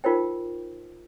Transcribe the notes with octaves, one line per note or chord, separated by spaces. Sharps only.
D#4 F4 A#4 C5 G5